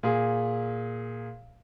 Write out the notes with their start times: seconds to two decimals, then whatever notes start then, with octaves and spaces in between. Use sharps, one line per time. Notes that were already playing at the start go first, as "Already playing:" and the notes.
0.03 A#2 G#4